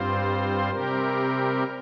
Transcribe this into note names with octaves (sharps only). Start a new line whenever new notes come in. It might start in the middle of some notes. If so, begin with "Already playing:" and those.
Already playing: G2 G3 C4 F4 C5
C3 G3 C4 G4 A#4